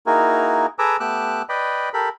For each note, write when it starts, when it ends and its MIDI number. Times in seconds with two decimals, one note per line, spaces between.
0.06 0.66 58
0.06 0.66 63
0.06 0.66 64
0.06 0.66 66
0.06 0.66 68
0.06 0.66 70
0.79 0.97 68
0.79 0.97 69
0.79 0.97 71
0.79 0.97 82
0.79 0.97 86
0.79 0.97 88
1.00 1.42 57
1.00 1.42 59
1.00 1.42 67
1.00 1.42 86
1.00 1.42 88
1.00 1.42 90
1.49 1.89 71
1.49 1.89 74
1.49 1.89 75
1.49 1.89 79
1.49 1.89 83
1.94 2.09 67
1.94 2.09 69
1.94 2.09 70
1.94 2.09 83